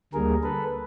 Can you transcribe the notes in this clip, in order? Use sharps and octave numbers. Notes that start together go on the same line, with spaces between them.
D2 D3 G3 A#3 G#4 A#4
A4 B4